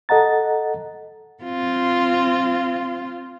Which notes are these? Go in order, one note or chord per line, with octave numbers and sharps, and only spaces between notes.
A4 D#5 F#5 A#5 A6
C4 F4